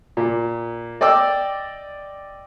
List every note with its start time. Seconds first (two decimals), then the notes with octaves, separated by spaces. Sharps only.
0.17 A#2
1.01 D5 D#5 G5 D6 E6